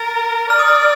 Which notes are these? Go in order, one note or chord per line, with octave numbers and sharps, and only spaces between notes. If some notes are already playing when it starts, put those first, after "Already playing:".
Already playing: A#4 A6
D5 F6
D#6
F6